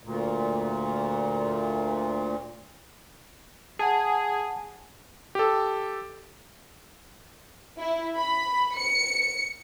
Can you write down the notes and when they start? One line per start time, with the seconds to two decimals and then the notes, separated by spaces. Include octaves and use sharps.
0.03 D2 A#2
3.79 G#4 F#5 G#5 A5
5.35 G4 A4
7.79 E4
8.16 B5
8.78 C#7